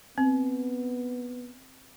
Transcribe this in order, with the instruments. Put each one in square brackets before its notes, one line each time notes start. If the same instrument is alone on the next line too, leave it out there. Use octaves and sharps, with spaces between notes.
[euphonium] B3 [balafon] C4